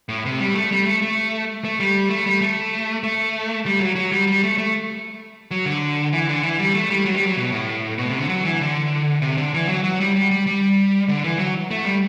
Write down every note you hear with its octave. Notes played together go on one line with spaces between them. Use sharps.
A2
C3
G3
A3
G3
A3
A3
A3
G3
A3
G3
A3
A3
G3
F#3
F#3
G3
G3
A3
A3
F#3
D3
E3
D3
E3
G3
A3
G3
F#3
G3
F#3
B2
A2
B2
C3
D3
F#3
E3
D3
C3
D3
E3
F#3
F#3
G3
G3
G3
G3
D3
E3
F#3
A3
G3